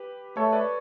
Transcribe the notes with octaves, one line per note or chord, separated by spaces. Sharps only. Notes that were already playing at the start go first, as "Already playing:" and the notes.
Already playing: G4 B4
A3 A4 C#5
B4 D5